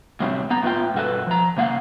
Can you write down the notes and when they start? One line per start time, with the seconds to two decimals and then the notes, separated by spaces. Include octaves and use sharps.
0.20 A2 C3 F#3 G3 A#3 C4
0.50 B3 A#5
0.63 A2 D#3 B3 D4 F4 G5
0.94 G2 B2 F#4 A4 B4
1.27 F3 A#5
1.57 C3 A#3 F5 F#5